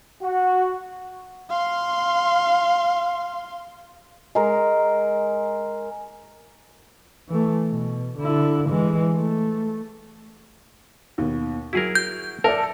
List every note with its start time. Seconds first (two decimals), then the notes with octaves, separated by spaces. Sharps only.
0.22 F#4
1.50 F5 C6
4.35 G#3 A#4
7.29 E3 A3
7.69 B2
8.18 D3 E4
8.70 E3 G#3
9.16 A3
11.18 D#2 B2
11.73 F#3 E4 F#4 G#4 A#4
11.95 G6
12.44 A4 A#4 D5 E5